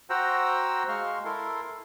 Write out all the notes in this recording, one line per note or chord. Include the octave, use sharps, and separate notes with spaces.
F#4 C5 F#5 G5 A#5 E6
G#3 F5 C6 C#6 F6
E4 A4 A#4 C6